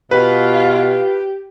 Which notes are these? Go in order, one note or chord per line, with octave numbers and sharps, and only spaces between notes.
B2 F4 G4 B4 F5